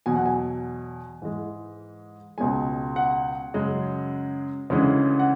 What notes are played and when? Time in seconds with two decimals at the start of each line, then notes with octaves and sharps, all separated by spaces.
0.06 E2 B2 F#3 G#5
0.16 F#5
0.26 G#5
1.22 G#2 E3 G#3
2.38 C#2 B2 G#3 G#5
2.96 F#5
3.54 F#2 C#3 G#3
4.70 D2 C#3 E3 G#3
5.19 F#5